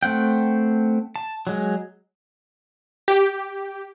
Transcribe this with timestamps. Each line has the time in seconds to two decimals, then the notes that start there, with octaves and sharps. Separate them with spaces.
0.03 A3 C4 F#5 G5
1.16 A5
1.47 F#3 G#3
3.08 G4